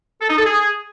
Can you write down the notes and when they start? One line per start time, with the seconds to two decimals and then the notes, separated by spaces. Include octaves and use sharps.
0.21 A4
0.30 D#4
0.38 A4
0.47 G#4